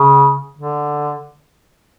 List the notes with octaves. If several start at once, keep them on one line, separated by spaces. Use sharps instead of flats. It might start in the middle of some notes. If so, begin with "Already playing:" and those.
Already playing: C#3
D3